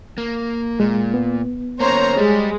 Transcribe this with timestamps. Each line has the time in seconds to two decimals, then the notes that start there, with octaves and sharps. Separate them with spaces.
0.18 A#3
0.80 A#2 G#3
1.14 B3
1.80 A#3 C#4 C5 C#5 A#5
2.17 G3 G#3